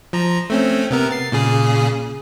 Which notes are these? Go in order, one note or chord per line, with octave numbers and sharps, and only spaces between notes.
F3 A#5
A3 C4 C#4
C3 B3 A#4
A6 C7
A#2 C#3 G#4